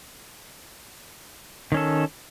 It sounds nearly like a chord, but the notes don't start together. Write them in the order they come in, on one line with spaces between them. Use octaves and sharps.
D#3 C#4 A4